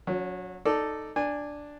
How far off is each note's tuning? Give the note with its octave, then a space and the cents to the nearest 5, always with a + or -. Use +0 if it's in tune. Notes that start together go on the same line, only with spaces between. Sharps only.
F#3 -25 C#4 +30
D#4 -10 A4 +0 D5 +0
D4 +0 G#5 -20